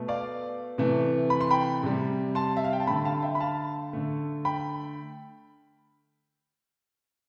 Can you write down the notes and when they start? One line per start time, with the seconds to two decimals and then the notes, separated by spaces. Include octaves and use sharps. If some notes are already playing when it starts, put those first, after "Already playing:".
Already playing: B2 A3
0.08 D5 F5
0.78 C3 E3 A3
1.30 B5
1.41 C6
1.51 G5 B5
1.83 C3 G3
2.35 A5 C6
2.57 E5
2.64 F5
2.73 G5
2.80 A5
2.87 D3 A3 G5 B5
3.05 F5 A5
3.23 E5 G5
3.35 B5
3.40 F5 A5
3.93 D3 A3
4.45 G5 B5